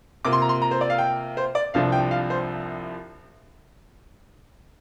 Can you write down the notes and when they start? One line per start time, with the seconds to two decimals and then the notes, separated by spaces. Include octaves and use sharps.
0.25 C3 A#3 F4 D6
0.33 C6
0.42 A#5
0.49 C6
0.62 A#5
0.71 C5
0.81 D5
0.90 F5
0.98 G5
1.37 C5
1.55 D5
1.74 C2 C3 F3 D4 F5
1.92 G5
2.11 F5
2.30 C5